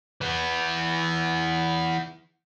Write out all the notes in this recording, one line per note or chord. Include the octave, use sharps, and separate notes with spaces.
E3 B3